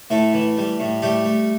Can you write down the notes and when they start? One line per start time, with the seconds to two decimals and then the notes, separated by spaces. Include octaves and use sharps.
0.10 A2 A3 A4
0.33 E3
0.57 G3
0.80 A2
1.02 G3 A3 G4
1.24 A3